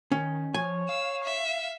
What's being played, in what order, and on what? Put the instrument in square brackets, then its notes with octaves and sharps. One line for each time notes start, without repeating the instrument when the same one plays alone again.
[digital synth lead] D#3 [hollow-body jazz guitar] C#4
[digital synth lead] F3 [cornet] C#5 [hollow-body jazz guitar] G#5
[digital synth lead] F5 [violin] E6
[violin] E5